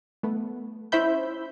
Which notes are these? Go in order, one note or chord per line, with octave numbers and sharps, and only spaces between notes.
A3 B3
C#4 E4 C5 E5 B5 G6